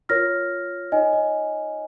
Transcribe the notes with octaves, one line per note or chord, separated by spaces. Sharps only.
F4 A#4 C#5 F6 A#6
D#4 C#5 D#5 G#5
D#5